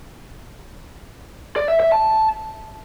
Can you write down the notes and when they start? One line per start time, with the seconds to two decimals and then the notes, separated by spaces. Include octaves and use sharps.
1.56 D5
1.68 E5
1.80 E5
1.92 A5